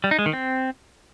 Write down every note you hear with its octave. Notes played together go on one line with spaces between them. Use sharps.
G3
D#4
G#3
D#3
C4